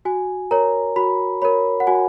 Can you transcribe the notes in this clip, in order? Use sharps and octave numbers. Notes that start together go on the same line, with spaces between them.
F#4 G#5
A#4 C#5 A#5
F#4 B5
A#4 C#5 B5
F#5
F#4 G#5